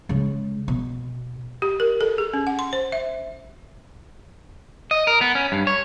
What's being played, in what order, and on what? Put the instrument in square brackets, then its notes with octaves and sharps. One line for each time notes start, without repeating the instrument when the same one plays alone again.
[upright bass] C#3 G#3
B2
[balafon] G4
A#4
A4
G#4
C#4
F#5
C6
C5
E5
[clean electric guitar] D#5
A#4
B3
C#4
G2
C#5